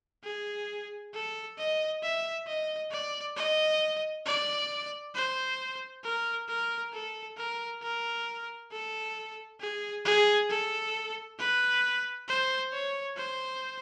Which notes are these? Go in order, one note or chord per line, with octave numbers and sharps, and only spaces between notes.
G#4
A4
D#5
E5
D#5
D5
D#5
D5
C5
A#4
A#4
A4
A#4
A#4
A4
G#4
G#4
A4
B4
C5
C#5
C5